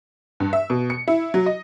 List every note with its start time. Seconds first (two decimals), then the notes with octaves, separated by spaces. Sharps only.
0.40 G2
0.53 E5
0.70 B2
0.90 C#7
1.08 E4
1.34 F#3
1.46 D#5